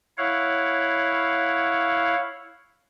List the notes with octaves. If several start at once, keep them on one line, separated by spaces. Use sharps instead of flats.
E4 C#5 F5 F#5